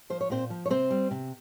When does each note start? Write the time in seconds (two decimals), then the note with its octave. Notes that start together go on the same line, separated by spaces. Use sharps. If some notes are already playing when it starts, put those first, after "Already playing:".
0.10 F3 C5
0.21 C#5
0.30 A#2 C4 C5
0.50 F3
0.66 C#5
0.70 C3 C4 C5
0.90 G3
1.11 C3